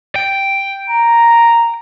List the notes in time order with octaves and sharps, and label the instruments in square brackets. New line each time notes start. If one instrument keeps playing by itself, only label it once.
[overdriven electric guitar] G5
[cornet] A#5